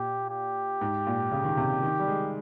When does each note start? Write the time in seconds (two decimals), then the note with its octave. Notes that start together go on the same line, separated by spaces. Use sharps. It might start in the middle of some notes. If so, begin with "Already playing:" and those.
Already playing: A#2 G4
0.30 G4
0.81 G#2
1.07 A#2
1.31 C#3
1.44 D#3
1.57 C3
1.82 D#3
1.99 G3
2.08 G#3